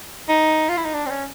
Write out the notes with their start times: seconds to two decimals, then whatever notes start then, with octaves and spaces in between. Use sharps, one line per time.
0.28 D#4
0.69 F4
0.77 E4
0.85 D#4
0.94 D4
1.06 C4
1.09 C#4